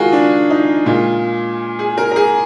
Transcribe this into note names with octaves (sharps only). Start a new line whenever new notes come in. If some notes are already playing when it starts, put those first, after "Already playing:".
Already playing: D#3 G#3 F4 F#4 G#4 A#4
D4
D#4
A#2 G#3 F4
G#4
A#4
A#4
G#4